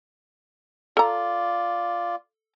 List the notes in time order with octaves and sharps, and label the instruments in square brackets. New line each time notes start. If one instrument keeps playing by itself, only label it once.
[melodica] F4 D5 [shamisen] A4 A#5